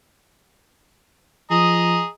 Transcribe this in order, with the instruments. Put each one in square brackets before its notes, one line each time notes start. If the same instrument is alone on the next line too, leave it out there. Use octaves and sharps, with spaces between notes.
[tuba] F3 [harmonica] G#4 D#5 A#5